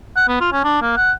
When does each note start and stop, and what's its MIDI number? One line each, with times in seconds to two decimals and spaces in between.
0.16 0.27 78
0.28 0.38 59
0.41 0.48 65
0.53 0.63 61
0.64 0.81 62
0.82 0.95 58
0.97 1.12 78